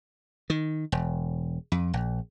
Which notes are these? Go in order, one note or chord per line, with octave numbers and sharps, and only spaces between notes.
D#3
E1
F2
A#1